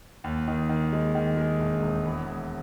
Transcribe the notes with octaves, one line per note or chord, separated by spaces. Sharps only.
D#2
D#3
D#3
G#3
D#3
G#3
E1
E1
E2
E2